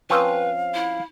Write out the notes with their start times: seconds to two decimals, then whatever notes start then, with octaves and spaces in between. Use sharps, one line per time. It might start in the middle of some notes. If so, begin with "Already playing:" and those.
0.10 F3 C4 C#4 B4 F5
0.74 E4